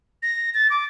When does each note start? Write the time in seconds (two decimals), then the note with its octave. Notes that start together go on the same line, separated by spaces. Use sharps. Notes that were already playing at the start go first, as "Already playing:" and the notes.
0.23 A#6
0.54 A6
0.70 D6